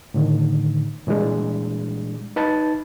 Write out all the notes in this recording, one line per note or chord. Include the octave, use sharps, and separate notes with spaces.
A2 D3 D#3
A#2 E3 G3 G#3 D4
D#4 B4 A5 A6